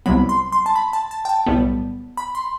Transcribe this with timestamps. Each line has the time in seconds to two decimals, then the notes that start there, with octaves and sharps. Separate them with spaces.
0.06 C2 C3 F#3 B3 B5
0.29 C6
0.52 C6
0.66 A5
0.76 B5
0.93 A5
1.11 A5
1.25 G5
1.29 A5
1.46 B1 A2 G3 B3
2.17 B5
2.35 C6